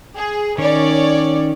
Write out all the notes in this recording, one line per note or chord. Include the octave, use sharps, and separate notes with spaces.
G#4
D#3 C#4 C#5 D5